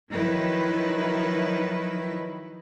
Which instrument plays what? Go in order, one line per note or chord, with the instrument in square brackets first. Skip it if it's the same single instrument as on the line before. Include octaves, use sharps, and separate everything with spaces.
[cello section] D#3 F3 F#3 D#4 E4 B4